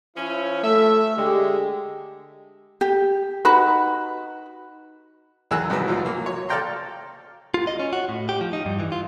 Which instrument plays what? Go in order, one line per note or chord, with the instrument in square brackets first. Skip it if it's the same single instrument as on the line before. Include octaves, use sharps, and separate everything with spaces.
[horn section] F3 C#4 E4
[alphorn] A3 [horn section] E5
[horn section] D3 G#3 [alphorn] G4
[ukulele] G4
D#4 F#4 B4 B5
[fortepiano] B1 E2 D#3 G#4 E6 F#6
C2 G#2 F#3 B4
B1 A2 F3 F#3
F#3 A#3
C#5
A4 D5 F5 G5 A#5 C6
[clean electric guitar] F4
D#5
C#4
F#4
A2
G4
F3
D#4
G2
E3
F4